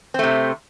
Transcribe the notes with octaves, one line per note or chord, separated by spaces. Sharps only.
C3 A3 C4